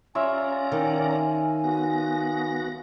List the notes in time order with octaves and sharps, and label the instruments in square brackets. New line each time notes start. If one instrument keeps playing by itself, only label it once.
[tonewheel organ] C#4 D5 A#5 [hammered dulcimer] F4 C#5 E5 [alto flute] G#5
[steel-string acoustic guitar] D#3
[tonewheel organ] B3 F#4 A#6